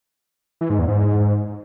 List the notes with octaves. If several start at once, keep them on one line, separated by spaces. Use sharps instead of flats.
E3
G#2
E2
G#2